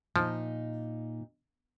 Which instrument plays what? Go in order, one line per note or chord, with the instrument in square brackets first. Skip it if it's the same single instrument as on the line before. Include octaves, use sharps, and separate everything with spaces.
[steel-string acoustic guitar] A#2 D#4 [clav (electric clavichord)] F3